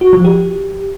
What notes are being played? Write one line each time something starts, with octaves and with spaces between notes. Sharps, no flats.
F#4
F3
G4